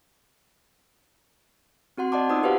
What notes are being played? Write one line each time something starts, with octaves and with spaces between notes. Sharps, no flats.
C4 F#4 F#5 C6
D5 D#5 F#5 A5 C6 D6
B3 D#4 F4 C5 D#6 E6
F#4 G4 B4 C5 F5 F#5